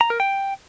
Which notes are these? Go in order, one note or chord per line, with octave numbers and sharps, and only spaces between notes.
A#5
A#4
G5